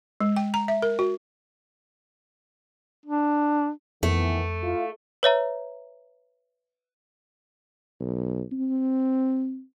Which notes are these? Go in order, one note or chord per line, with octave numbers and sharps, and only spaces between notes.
G#3
G5
A#5
E5
A#4
F#4
D4
F2 D#3 E3 A3 B3
E4 F4
B4 C#5 E5 A#5
B1
C4